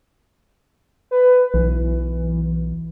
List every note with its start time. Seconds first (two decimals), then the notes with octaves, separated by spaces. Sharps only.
1.11 B4
1.54 B1 E3